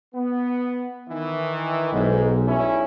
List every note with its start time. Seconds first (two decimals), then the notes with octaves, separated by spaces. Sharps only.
0.14 B3
1.09 D#3 E3
1.92 B1 G#2
2.46 G2 C#4 E4